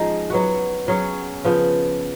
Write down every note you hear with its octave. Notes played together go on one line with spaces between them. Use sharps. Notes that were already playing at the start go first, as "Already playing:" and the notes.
Already playing: F3 G#3 C#4 D#4
F#3 B3 F#4
F#3 C#4 G#4
C#3 F3 B3